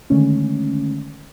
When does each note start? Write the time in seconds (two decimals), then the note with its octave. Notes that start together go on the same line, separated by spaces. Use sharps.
0.10 D3 D#3 G#3 A3 C#4